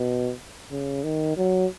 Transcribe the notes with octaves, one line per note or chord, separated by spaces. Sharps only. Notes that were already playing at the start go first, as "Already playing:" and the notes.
Already playing: B2
C#3
D#3
F#3